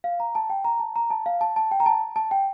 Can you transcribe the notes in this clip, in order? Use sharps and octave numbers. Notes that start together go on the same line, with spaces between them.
F5
A#5
A5
G5
A#5
A5
A#5
A5
F5
A5
A5
G5
A#5
A5
A5
G5